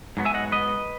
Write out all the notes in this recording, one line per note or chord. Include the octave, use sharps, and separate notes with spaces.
G#2 F#3 B3
E5 G#5
D#5 F#5
B4 D#5